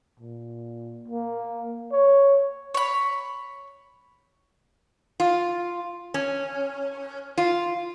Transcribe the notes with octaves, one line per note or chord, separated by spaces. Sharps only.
A#2
A#3
C#5
C#5 B5
F4
C#4
F4